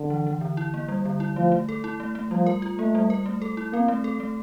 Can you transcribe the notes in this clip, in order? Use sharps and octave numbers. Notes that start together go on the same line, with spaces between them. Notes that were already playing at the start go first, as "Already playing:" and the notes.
Already playing: D3
E3
E3
D3
E4
A#3
G3
D3
E4
F3 A3
A3
A4
E4
A3
A3
F3 G3
A#4
F4
A3 A#3
G3
A#4
A3
A4
E4
A#3 C4
A3
A4
A3